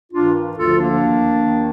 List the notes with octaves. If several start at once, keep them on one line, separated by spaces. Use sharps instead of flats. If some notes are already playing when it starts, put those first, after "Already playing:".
G2 D#3 D4 F4
D2 D3 F3 F4 A4
A#3 D4
D#2 D#3
D#2 D#3